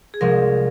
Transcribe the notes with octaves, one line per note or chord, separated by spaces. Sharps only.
G#4
C2 C3 F3 G#3 A#4